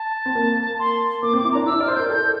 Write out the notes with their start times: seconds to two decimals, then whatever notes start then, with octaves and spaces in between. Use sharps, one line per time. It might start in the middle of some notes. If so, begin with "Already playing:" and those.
Already playing: A5
0.26 C4
0.35 A#3
0.79 C6
1.22 A#3 D6
1.33 C4 D6
1.44 E4
1.52 D4 A#5
1.66 E4 E6
1.80 D5 F6
1.88 C5
1.95 A#4 G6
2.10 A4 G6